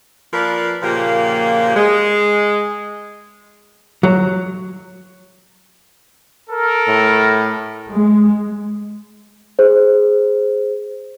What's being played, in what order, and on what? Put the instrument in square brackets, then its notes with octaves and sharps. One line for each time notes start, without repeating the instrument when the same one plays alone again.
[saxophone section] F3 A#3 A#4 B4 D5
A#2 C#3 F3 A#3 G4
G#3
[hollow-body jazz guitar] F#3
[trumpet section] A4 A#4
[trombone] A2
[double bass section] G#3
[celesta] G#4 C5